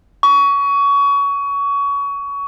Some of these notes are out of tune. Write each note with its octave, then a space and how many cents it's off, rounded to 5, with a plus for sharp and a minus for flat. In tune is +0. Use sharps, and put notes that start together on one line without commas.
C#6 +25